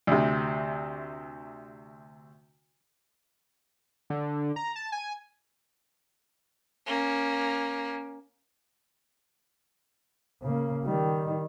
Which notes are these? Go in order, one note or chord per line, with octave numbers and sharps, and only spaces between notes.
D2 C3
D3
A#5
A5
G#5
A#3 C#4
C#3 A#3
D#3 G3